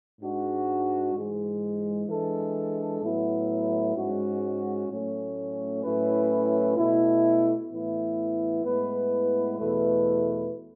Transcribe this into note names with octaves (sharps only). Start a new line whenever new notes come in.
G#2 G#3 D4 F#4
G#2 E3 G#3
E3 G#3 D4 A4
A2 F#3 B3 E4
G#2 G#3 C#4 F#4
A2 F#3 A3 C#4
A2 F#3 C#4 E4 B4
B2 A3 E4
A2 E3 B3 E4
A2 G#3 B3 E4 B4
E2 B2 A3 E4 B4